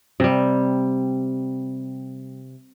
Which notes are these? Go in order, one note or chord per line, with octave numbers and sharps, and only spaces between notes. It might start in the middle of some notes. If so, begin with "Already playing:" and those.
C3 G3